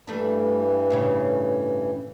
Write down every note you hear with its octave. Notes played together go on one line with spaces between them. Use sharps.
G2 E3 G3 A3 D4
A2 C#3 C#4